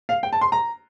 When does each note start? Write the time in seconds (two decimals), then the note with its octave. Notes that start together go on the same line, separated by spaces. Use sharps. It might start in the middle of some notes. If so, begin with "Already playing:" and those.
0.09 F5
0.23 G5
0.33 A5
0.41 C6
0.52 A#5